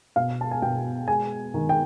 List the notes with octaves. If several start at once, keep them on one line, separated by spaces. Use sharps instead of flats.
B2 F5
A5
G#5
B2 G5
G#3 G#5
D#3
G5